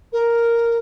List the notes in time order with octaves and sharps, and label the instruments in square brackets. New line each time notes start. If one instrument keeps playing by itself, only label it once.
[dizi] A#4